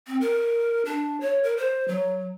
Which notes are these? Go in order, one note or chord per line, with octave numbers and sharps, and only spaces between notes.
C4
A#4
D4
C#5
A#4
C5
F#3